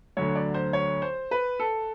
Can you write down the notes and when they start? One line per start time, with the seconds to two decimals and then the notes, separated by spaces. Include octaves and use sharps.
0.17 D2 D3 F#3 C#5
0.35 D5
0.54 C5
0.73 C#5
1.02 C5
1.31 B4
1.60 A4